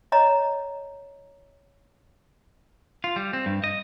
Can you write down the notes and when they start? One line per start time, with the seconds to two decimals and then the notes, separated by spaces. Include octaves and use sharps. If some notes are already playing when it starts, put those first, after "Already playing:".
0.12 C#5 D#5 A#5
3.04 F4
3.16 G3
3.33 C4
3.46 G2
3.64 D#5